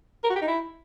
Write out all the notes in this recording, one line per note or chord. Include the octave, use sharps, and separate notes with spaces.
A#4
F#4
G4
D#4
E4